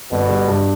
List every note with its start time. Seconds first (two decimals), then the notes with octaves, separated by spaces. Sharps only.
0.11 G1 B2
0.29 G3
0.48 G2